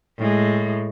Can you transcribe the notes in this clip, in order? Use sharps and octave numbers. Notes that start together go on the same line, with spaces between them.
A2 G#3